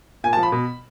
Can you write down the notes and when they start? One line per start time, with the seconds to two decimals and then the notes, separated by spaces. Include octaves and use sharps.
0.24 A#2 G#5
0.33 A5
0.37 F3
0.43 B5
0.52 B2